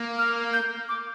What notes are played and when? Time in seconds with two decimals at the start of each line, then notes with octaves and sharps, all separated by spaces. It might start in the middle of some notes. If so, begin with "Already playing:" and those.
Already playing: A#3
0.18 F6
0.53 G6
0.89 D6